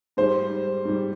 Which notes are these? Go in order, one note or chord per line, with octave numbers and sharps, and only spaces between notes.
G#2 G3 C5
G#2 G3